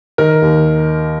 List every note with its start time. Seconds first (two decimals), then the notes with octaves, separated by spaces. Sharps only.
0.18 D#3 A#4
0.42 D#2